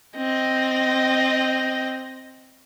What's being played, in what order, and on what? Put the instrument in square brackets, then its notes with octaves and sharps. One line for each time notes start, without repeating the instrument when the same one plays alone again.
[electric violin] C4 D#5